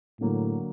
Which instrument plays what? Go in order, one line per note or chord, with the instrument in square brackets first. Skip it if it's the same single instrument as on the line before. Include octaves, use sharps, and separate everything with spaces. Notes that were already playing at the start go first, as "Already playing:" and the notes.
[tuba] A2 [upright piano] D3 F#3 A#3